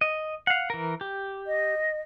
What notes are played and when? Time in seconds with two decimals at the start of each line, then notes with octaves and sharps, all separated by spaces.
0.01 D#5
0.47 F5 F#5
0.70 E3 A#4
1.01 G4
1.47 D#5